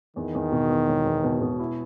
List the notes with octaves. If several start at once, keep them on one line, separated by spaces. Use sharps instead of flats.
E2 D#3
E2
B2
E2
E1
E2
B2
B2
E4